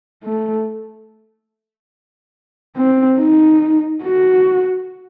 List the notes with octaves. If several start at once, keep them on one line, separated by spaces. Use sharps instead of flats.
A3
C4
D#4
F#4